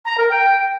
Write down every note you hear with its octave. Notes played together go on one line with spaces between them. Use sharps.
A#5
A#4
G5